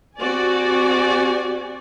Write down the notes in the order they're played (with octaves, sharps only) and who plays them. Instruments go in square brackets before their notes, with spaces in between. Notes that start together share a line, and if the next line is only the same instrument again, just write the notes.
[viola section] C4 F#4 G4 D5 G#5